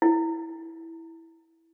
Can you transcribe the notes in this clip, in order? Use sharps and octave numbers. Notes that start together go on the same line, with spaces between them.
E4